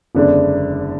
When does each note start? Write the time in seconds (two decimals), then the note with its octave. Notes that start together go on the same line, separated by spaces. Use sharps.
0.15 F#1 E2 D3 G#3 D4